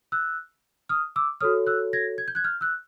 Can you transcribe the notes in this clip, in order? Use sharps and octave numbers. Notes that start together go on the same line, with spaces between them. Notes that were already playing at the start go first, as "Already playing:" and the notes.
E6 F#6
D#6 F6
D6 E6
F#4 A4 C#5 D#6 F6
E6 F#6
G#6 A#6
G#6
G6
F#6 G#6
F6 G6
E6 F#6